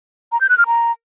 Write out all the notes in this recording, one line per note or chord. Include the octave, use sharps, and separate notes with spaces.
A#5
G6
F#6
F6
A#5